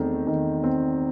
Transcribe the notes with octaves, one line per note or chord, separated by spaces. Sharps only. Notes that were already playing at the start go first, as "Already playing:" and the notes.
Already playing: E2 D#3 A3 C4
D#3
C4